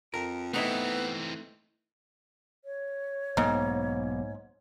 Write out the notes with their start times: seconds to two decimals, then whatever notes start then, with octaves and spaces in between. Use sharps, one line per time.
0.14 F2 A#4
0.53 E3 A3 B3 C4 D#4 E4
2.65 C#5
3.37 B1 G#2 A#3 B3